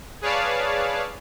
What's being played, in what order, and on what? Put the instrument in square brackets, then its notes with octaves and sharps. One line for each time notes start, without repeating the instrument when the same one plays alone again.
[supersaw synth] G#4 B4 C#5 D5 F5 A5